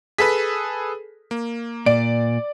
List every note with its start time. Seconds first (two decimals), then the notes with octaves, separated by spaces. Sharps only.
0.18 G#4 A4 B4 B6
1.31 A#3
1.86 A#2 D5 D7